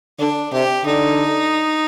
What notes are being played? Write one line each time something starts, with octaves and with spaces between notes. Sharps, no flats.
D3 D4
C3 G4
D3 D#4